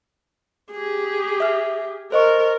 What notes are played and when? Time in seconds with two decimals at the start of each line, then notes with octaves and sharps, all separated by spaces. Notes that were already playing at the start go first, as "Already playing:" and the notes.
0.71 G4 G#4
1.40 E5 F6
2.12 A#4 C5 D#5 C#6